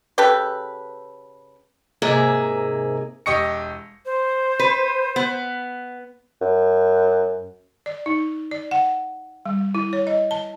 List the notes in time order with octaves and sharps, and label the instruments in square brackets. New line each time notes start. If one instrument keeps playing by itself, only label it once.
[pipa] C#3 G4 A4 B4
[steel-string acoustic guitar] G#2 C3 A#3 G#4 E5
[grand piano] E1 G4 D#5 C#6 A#6 C#7
[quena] C5
[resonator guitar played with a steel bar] B4
B3
[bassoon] F#2
[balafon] D5
D#4
D5
F#5
G3
E4
C#5
D#5
A5